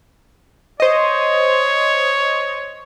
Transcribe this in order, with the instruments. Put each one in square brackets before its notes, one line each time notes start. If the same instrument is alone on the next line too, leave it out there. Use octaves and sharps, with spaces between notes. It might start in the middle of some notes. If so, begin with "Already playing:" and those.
[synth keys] C5 D#5 [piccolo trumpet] C#5